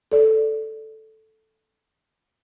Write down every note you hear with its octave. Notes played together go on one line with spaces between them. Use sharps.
A4 D5